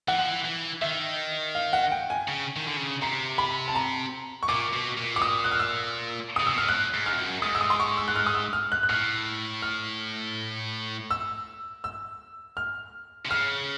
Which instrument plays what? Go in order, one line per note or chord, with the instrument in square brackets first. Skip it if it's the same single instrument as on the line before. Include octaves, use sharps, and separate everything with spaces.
[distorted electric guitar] E3 [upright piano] F#5
[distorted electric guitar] F3
E3
E3
[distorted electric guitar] D#3 [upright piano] E5
[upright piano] F5
F#5
G5
G#5
[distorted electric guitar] C#3
D#3
D3
C#3
[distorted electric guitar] C3 [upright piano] A#5
[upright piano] B5
A5
A#5
C#6
[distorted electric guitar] A#2 [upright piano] D6
[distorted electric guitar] B2
A#2
[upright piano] D6
D#6
F#6
F6
E6
[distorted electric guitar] C#3 [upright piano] D#6
[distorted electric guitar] C3 [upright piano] E6
[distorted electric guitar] B2
[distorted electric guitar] A#2 [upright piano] F6
[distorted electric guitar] A2 [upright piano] F#6
[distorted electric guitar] G#2
[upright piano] F6
[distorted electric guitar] F2
F#2
[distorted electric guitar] G#2 [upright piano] D#6
[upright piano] E6
D#6
C6
C#6
E6
F#6
F6
D#6
E6
F6
F#6
F#6
[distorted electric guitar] A2 [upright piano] F6
[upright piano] F6
E6
E6
F6
[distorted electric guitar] C3
[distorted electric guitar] C#3 [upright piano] F6